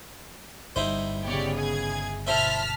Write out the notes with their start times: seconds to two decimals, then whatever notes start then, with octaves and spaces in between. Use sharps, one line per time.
0.76 G1 G3 D#4 E4 C5
1.24 C#3 B3 G4 C#5 D5
1.55 G#4 G#6
2.27 B2 E4 C5 E5 A5 F6 B6